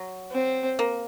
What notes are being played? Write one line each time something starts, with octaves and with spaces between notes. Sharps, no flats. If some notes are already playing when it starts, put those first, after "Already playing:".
Already playing: F#3
C4
A#3